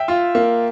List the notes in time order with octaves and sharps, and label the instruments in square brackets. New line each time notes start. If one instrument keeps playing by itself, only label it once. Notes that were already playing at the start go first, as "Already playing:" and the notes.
Already playing: [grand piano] E5 G5
[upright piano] F4
A#3